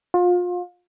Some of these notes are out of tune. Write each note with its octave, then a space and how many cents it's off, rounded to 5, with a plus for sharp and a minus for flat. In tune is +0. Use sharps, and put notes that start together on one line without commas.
F4 +30